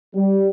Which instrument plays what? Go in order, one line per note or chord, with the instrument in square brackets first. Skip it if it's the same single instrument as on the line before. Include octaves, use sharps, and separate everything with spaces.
[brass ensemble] G3